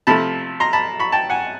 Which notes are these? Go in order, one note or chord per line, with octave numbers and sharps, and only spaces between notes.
C3 F3 A3 A5 B5
A#5 C6
A5 B5
B5 C#6
G5 A5
F#5 G#5